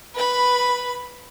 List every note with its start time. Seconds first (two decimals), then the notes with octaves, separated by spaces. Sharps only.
0.15 B4 B5